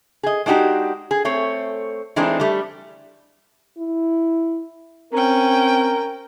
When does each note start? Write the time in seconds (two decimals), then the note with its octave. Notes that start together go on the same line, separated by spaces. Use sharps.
0.23 G#4 D#5
0.46 G#3 D4 D#4 F#4 G4
1.11 G#4
1.25 A3 C4 C#5
2.16 E3 G#3 A3 C4 D4 D#4
2.40 G3 A3
3.78 E4
5.13 C4 C#4 A#4 G5